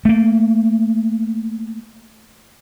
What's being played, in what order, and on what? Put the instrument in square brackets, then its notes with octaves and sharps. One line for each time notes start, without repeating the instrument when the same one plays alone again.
[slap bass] A3 A#3